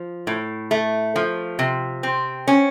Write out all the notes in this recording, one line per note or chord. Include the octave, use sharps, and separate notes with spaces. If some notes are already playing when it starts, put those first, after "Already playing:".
Already playing: F3
A2
A3
F3
C3
C4
C#4